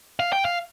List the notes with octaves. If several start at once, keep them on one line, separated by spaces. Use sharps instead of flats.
F5
G5
F5